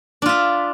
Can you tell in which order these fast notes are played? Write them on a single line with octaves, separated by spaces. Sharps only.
D4 F4 E5